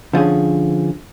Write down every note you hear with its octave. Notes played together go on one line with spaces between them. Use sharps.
D3 F3 C#4 G#4